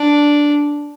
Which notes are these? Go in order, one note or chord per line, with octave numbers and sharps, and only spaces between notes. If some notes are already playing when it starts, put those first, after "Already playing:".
Already playing: D4